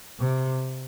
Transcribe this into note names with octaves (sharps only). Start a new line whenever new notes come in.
C3